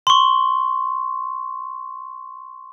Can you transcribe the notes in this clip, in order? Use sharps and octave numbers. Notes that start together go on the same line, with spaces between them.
C6 C#6